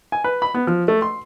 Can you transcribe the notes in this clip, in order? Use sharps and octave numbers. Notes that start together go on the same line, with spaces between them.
G#5
B4
B5
B3
F3
A3
C6